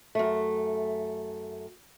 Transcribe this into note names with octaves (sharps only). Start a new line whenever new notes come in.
F#2 A3